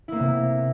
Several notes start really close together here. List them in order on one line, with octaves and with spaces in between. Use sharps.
E4 A#3 B3 C3